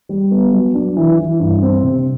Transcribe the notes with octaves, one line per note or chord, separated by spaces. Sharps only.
G3
B3
F#3
D4
E3
E3
G2
C4
C3